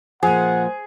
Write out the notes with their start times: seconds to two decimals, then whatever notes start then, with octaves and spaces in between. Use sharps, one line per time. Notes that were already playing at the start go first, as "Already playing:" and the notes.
0.23 A#2 F3 G#4 C5 F#5